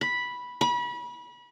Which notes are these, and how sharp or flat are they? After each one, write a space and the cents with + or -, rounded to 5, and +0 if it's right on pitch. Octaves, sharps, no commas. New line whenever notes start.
B5 -5
B5 -30